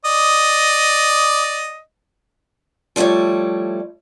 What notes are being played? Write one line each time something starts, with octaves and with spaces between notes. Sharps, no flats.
D5 D#5
F3 G3 A3 E4 C#5